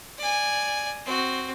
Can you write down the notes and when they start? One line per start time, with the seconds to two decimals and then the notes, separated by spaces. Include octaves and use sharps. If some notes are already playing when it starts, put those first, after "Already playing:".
0.18 D5 G#5
1.06 C4 F#4